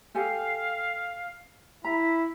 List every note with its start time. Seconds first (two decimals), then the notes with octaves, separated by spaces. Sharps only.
0.15 G4 A4 F5 G#5
1.85 E4 A#5 B6